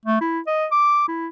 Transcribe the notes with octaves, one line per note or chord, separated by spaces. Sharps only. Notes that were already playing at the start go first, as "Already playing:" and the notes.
A3
E4
D#5
D6
E4